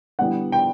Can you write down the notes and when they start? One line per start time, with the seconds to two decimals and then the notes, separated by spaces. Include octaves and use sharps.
0.19 D3 G3 B3 E4 F#5
0.52 G5